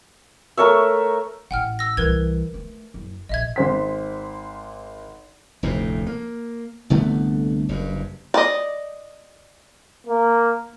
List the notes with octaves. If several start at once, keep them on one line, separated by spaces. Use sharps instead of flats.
A3 A#4 C#5 E5
A1 F#5 G5 F6
E6 A#6
C2 E3 A#4 B4 G#6
A3
F#1
A#1 D#5 E5 G#6
G#1 C5 B6
F1 D2 A2
A#3
C2 D3 A3 B3
F#1 G2
D5 D#5
A#3